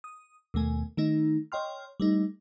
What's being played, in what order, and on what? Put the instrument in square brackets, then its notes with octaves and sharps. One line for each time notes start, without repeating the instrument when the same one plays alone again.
[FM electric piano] D#6
D#2 B2 A3 G#5
D#3 A3 D#4
C#5 D#5 G5 C6 F6
G3 A3 D#4